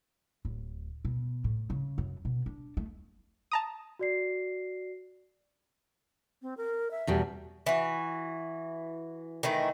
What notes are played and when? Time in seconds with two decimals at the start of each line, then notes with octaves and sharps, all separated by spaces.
0.45 D1
1.05 B2
1.44 A2
1.70 C#3
1.98 F#2
2.25 B2
2.46 D4
2.77 A3
3.52 A5 A#5 D#6
3.99 F#4 D5 C7
6.42 C4
6.57 A#4
6.91 E5
7.07 E2 B2 G3
7.66 E3 F#4
9.43 D#3 E3 A3